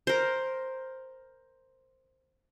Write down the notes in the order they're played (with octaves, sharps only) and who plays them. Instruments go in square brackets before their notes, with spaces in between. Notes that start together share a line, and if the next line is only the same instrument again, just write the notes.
[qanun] A#4 C5